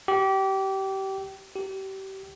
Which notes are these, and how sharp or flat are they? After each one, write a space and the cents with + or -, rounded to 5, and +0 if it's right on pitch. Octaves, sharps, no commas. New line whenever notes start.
G4 -25
G4 -30